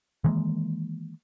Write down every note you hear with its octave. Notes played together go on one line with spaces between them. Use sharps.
D#3 E3 G#3 A#3